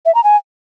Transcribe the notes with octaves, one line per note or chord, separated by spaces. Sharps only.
E5
A#5
G#5